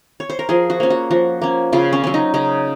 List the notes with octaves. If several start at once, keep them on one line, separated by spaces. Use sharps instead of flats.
C#5
C5
A#4
F3 G#4
F#4
A#3 C#4
F#4
F3 F#4
A#3 C#4
C#3 F4
C#4
F#3 C#4
D#4
C#3 D#4